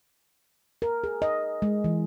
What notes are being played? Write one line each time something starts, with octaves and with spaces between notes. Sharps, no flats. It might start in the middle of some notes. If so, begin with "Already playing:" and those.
A#4
G#4
D#5
G#3
E3